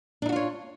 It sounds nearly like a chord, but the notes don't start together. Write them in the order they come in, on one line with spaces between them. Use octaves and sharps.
D4 D#4 F#4 F4 C#5